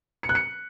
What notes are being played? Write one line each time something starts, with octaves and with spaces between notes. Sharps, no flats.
C#7
F#6
C#7